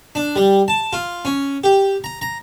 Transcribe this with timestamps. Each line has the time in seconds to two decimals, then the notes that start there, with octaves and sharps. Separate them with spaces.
0.15 D4
0.36 G3
0.68 A5
0.93 F4
1.25 C#4
1.64 G4
2.04 A#5
2.22 A#5